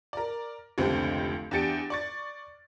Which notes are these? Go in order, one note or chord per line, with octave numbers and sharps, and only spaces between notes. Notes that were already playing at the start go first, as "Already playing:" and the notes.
A#4 D5
F1 C#2 D3 C4 G4
E2 D4 G4 A6 C#7 D7
D5 C#6 A6